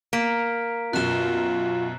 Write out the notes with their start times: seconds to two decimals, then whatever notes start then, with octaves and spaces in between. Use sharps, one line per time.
0.13 A#3 A#5 B6 D7
0.93 F#2 B2 F4 F#6 E7 G7